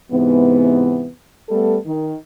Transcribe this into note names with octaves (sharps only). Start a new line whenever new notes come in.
G#2 C3 E3 B3
G3 A3 B3 A4
D#3